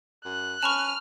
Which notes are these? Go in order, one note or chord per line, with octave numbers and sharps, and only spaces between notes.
F#2 F#6
C#4 A5 B5 C#6 F6